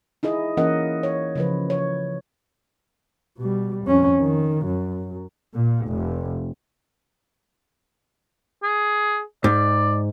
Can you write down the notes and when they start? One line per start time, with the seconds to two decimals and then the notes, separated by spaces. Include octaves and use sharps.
0.23 D#4 E4 G#4 D#5
0.57 E3 A#3 C#4 A#4 D#5 F#5
1.03 C#5
1.36 C#3 F3 B4
1.70 C#5
3.38 B2 G3
3.86 F2 C#4
4.20 D#3
4.66 F#2
5.53 A#2
5.87 F1
8.63 G#4
9.44 G#2 D5